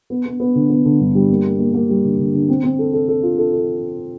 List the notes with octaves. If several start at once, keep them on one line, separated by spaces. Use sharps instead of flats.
B3
B3
B3
D3
B3
D3
G2
G3
A#3
A#3
A#3
A#3
G3
D3
D3
D3
C4
C4
A4
A4
A4
F4
A4
A4